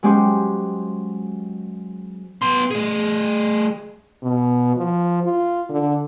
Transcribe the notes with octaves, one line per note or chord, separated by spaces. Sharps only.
F#3 G#3 C#4 G4 C5
B3 C6
A3 G#4
B2
F3
F4
D3